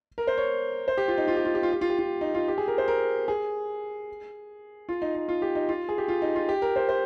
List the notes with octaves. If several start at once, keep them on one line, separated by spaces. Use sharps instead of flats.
A#4
C5
C#5
C5
G4
F4
D#4
F4
G4
F4
G4
F4
G4
F4
G4
F4
D#4
F4
G4
G#4
A#4
C5
A#4
G#4
F4
D#4
D#4
F4
G4
D#4
F4
G#4
G4
F4
D#4
F4
G4
A#4
C5
C5